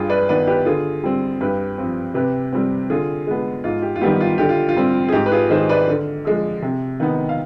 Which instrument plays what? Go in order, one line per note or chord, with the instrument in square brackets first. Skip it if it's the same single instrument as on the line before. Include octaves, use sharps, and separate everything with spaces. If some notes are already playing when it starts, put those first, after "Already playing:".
Already playing: [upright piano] G2 F4 G#4
B4 D5
D#3 B3 B4 D5
G4 B4
D3 F4 G#4
G3 C4
G2 G4 B4
F3 C4
C3 G4 B4
G3 C4
D3 F4 G#4
G#3 B3
G#2 F4
G4
F4
D#3 G3 B3 G4
F4
D3 G4
F4
F4
G3 C4
G#4
G#2 G4
B4
F4 G#4
D#3 G#3 G#4 C5
B4 D5
D3
F3 G#3
C3
D#3 B3
F5